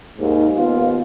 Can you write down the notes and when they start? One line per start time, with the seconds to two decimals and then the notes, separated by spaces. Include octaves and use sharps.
0.19 D#2 G#2
0.56 D#2 B3 F4